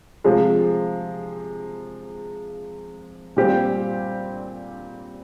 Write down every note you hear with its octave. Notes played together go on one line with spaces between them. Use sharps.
C3 F3 G#3
A#2 G3 C4 G4